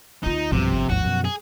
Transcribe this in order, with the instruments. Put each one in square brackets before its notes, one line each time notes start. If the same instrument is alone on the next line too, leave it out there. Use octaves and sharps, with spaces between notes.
[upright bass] D2 F4 [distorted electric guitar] D#4
[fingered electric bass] B1 G2 [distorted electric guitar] C3 [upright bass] F3 B3
[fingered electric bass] G1
[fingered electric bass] G#1 D#2 G#2 [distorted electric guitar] F#4
[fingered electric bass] F#2 B2
[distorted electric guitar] G#4